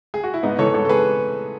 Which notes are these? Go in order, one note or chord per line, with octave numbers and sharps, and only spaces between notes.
G#4
F#4
E4
G#2 B3 D#4
E3 A4 C#5
G#2 A4 C#5
A4
G#4 B4